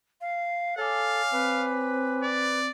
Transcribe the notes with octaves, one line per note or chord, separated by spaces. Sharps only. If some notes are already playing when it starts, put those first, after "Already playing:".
F5
A4 C#5 F5 G#5 D6
C4 B4
D5